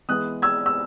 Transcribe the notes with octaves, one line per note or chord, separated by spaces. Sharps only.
E3 G#3 B3 D#6 F#6
E6 G#6
E6